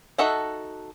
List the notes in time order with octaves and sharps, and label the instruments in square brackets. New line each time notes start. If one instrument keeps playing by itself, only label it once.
[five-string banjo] D#4 F#4 A4 E5 F#5